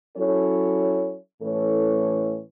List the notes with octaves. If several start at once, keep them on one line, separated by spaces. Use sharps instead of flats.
F#3 C#4 E4 A4 C#5
A2 E3 C#4 A4 C#5